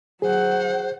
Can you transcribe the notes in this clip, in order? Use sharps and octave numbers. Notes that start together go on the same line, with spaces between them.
F#3 G#4 C5 F#5